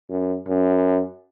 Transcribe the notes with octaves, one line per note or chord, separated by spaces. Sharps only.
F#2
F#2